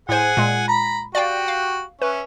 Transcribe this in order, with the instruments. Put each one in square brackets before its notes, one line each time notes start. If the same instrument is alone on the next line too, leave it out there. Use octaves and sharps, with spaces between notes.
[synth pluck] A2 C5 [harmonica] G#4 F#5 G#5
[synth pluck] A#2 G#3
[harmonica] A#5 B5
[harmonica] F#4 G4 [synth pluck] D5 F5 G5
[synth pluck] F5
[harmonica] C#4 E5 [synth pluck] B4